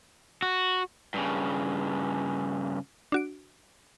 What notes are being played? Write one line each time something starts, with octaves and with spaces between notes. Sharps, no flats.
F#4
G2 C#3
D4 F#4 D7